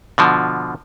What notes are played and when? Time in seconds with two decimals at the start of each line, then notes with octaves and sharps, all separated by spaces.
0.18 B2 D3 F3